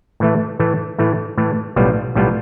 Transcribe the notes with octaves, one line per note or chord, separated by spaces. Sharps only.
A2 E3 A3
A2 E3 A3
A2 E3 A3
A2 E3 A3
B1 A2 G3 B3 F4
B1 A2 G3 B3 F4